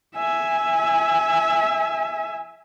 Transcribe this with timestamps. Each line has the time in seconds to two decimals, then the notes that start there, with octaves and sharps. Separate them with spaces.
0.15 E5 G#5